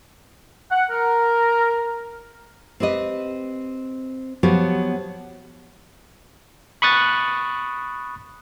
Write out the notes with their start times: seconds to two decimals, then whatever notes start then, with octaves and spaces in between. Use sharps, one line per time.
0.71 F#5
0.91 A#4
2.80 C4 G4 B4 D#5
4.43 F3 F#3 B3 F#4 G4 C#5
6.82 B5 C#6 D#6 F#6 A6